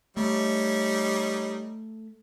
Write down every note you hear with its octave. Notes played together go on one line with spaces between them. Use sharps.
G3 A3 D#4 C#5